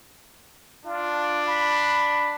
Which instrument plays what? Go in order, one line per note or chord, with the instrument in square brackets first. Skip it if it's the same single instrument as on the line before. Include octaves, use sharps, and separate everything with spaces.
[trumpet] D4 [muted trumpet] F4
[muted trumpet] B5